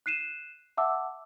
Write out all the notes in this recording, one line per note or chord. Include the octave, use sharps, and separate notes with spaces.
F#6 C7 D#7 E7
E5 F#5 A5 D6 E6